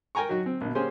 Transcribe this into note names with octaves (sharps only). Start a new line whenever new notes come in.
A#4 G5 G#5 A#5 C#6
F#3 D#4 F#4
C4
A#1 B2
A#3 C#4 G4 G#4 C5 C6